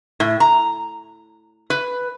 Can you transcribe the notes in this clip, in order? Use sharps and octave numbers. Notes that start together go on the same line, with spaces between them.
A2
A#5
B4